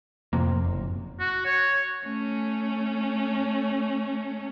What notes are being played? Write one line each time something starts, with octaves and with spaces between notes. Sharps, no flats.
F2 A2 C3 A#3
F#1
F#4
C#5
A3 C#4